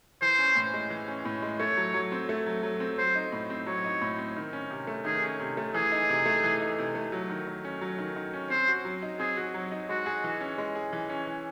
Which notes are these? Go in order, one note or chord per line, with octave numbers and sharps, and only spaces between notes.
E3 C5
C#4
A2
G#3
E3
C#4
A2
G#3
A3 C#5
F#3
F#3
C4
A3
F#3
F#3
C4
F#3 C5
D#4
A2
C4
F#3 C#5
D#4
A2
C4
D#3
C#4
C3
A3
D#3 G#4
C#4
C3
A3
E3 G#4
D#4
C3
A3
E3
D#4
C3
A3
F#3
D#3
D#3
C#4
F#3
D#3
D#3
C#4
C4 C5
F#4
F#3
D#4
C4 G#4
F#4
F#3
D#4
G#3 F#4
G#4
E3
C#4
G#3
G#4
E3
C#4
E3